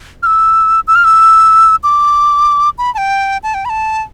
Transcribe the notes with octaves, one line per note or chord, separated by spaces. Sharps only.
F6
E6
E6
F6
E6
D6
B5
A5
G5
A5
G5
B5
A5